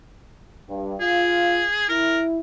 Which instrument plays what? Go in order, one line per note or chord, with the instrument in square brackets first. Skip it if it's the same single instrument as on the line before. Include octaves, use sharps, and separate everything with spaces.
[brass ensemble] G2
[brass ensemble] F4 F5 [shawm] G#4
[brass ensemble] E4 [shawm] A#4